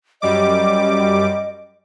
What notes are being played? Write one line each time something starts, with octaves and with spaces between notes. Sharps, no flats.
F#2 G3 D#5 D6